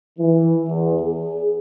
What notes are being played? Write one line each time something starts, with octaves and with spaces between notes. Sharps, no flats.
E3
E2
G#4